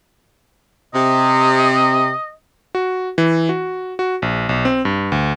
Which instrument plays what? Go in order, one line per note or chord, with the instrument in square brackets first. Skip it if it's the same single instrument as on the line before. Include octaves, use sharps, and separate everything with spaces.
[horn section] C3 [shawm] D#5
[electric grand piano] F#4
E3
F#4
F#4
A#1
B1
C4
G2
D2